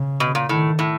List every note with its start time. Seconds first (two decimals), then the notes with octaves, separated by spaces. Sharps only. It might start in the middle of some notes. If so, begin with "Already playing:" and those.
Already playing: C#3
0.20 B2
0.35 A#2
0.49 A2 D#3
0.79 A2